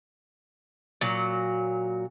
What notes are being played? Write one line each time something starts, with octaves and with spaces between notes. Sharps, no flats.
A#2 F#3